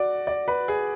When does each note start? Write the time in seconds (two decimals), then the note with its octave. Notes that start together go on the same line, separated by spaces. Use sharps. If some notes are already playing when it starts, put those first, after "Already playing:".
Already playing: F#4 D5
0.27 D5
0.48 B4
0.68 G#4